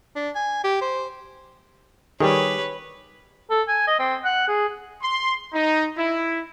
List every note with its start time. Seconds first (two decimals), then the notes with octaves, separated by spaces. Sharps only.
0.16 D4
0.35 G#5
0.64 G4
0.81 C5
2.20 D#3 G3 G4 G#4 B4 C#5
3.50 A4
3.68 G#5
3.87 D#5
3.99 C4
4.24 F#5
4.48 G#4
5.02 C6
5.54 D#4
5.97 E4